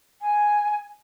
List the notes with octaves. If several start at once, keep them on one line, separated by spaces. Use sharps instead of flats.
G#5